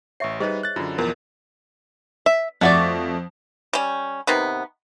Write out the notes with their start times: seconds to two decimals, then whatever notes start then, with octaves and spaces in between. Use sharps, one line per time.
0.20 A1 C#5 E5 C#6 C7
0.40 G3 D#4 G#4 B4 C5 D#5
0.63 F#6 A6
0.76 F#2 D3 F4
0.98 B1 E2 F3 A#4
2.26 E5
2.61 F2 A3 F#4 D5
3.73 G3 C#4
4.27 C3 D#3 B3